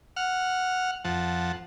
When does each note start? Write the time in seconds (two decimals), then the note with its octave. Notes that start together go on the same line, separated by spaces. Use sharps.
0.16 F#5 F6
1.05 F2 F3 F#5 A5